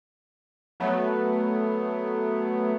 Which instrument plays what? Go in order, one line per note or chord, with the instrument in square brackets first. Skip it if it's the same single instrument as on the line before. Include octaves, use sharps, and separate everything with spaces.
[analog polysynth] F#3 A3 B3